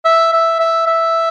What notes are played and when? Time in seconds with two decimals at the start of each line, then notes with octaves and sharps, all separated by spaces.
0.05 E5
0.33 E5
0.59 E5
0.87 E5